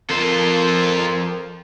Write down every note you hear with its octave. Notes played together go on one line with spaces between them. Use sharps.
F2 F4 A4 A#4 C5